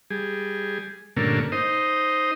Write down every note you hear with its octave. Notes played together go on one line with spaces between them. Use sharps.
G3 G#4
G2 A#2 D3 A3 A#3 C#4
D#4 C5 D#5